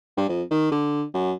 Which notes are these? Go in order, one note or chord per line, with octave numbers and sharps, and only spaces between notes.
G2
F2
D#3
D3
F#2